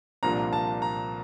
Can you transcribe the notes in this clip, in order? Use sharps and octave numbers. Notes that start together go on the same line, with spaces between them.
C2 A#2 F3 A#3 D4 A#5
A5
A#5